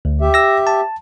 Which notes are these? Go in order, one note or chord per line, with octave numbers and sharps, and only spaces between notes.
D2
G4 E5
E6 A#6
A5